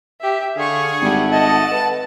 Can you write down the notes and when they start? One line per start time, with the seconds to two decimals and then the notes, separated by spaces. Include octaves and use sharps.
0.21 G4 E5
0.57 D3 G#4 F5 C#6
1.01 G#1 G3 A3 F#5
1.31 D#5 A5
1.72 B4